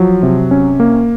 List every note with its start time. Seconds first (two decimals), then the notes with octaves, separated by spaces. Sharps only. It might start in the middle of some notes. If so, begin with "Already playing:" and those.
Already playing: F3 F#3
0.23 C3
0.51 C#4
0.80 A#3